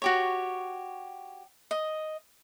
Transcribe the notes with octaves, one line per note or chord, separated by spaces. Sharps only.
F#4 G4 C#5
D#5